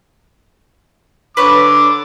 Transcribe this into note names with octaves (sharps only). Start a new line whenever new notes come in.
D3 B4 C#5 D6